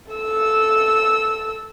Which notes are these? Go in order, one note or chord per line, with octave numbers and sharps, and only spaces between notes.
A4 E6